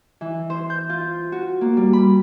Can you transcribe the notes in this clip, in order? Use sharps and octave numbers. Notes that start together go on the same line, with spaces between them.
E3
C5
G6
F4
F#4
A#3
G3
B5